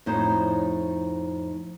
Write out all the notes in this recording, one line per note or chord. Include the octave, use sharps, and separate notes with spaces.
F2 A2 D#4 C5 C#5